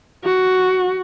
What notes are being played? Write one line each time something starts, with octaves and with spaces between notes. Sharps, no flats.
F#4